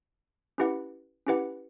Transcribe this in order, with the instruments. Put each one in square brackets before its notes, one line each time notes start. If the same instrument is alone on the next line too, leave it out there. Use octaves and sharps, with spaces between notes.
[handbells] C#4 E4 G4 B4 F#5
C#4 E4 G4 B4 F#5